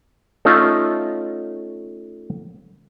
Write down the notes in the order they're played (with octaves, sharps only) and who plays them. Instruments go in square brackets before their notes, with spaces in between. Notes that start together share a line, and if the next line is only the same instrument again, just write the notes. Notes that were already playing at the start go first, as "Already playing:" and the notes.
[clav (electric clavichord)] A3 C#4 D#4 F4